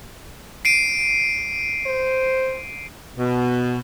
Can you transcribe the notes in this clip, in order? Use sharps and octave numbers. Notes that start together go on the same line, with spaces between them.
C7 D7 D#7
C5
B2